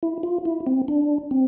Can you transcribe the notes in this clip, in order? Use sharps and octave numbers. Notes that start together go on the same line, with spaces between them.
E4
F4
E4
C4
D4
C4